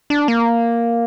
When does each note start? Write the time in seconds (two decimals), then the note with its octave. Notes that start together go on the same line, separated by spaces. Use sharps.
0.10 D4
0.28 A#3